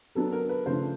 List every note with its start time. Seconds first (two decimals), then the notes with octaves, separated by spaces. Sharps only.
0.15 F#3 B3 D4 A4
0.32 A#4
0.49 B4
0.66 C#3 F3 A3 D4 C5